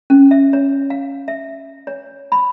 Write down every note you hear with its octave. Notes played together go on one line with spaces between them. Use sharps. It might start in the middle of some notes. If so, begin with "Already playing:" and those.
C#4
E5
C#5
F5
E5
C#5
B5